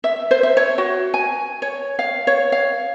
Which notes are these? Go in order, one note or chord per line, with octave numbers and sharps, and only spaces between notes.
E5
C5
E5
C#5
F#4
G#5
C#5
F5
C#5
F5